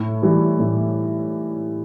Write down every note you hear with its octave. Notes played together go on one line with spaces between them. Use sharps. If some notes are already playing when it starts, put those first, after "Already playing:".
Already playing: A2
E3 G3
A2